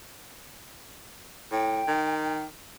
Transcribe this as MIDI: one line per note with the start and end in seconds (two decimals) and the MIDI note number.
1.52 1.82 45
1.52 2.44 79
1.88 2.46 51